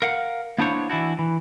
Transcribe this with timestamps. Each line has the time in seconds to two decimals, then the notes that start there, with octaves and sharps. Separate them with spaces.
0.02 A#4 F5 F#5
0.58 A#3 B3 D4 E4 C5 C#5
0.90 E3 D4 E4 F#4
1.19 E3